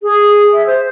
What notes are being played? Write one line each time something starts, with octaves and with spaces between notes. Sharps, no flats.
G#4
E5
C5